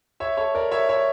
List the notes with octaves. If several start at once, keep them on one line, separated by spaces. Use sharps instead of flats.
C#5 E5
A4 C#5
A#4 D5
C#5 E5
C#5 E5